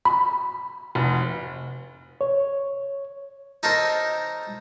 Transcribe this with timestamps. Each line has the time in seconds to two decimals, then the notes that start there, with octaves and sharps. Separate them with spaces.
0.05 B5
0.95 F1
2.21 C#5
3.63 D#4 A4 A#4 C5 C#5 A5